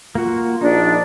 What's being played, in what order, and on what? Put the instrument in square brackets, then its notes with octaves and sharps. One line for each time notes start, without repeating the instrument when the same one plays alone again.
[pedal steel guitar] A#3 F#4 [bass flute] F4
[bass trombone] A#1 [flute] D4 [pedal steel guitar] D#4